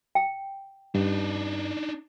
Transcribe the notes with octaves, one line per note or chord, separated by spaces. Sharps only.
G5
G2 D4 D#4